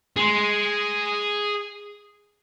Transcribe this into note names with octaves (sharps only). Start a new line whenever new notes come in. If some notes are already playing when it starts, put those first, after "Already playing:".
G#4 C6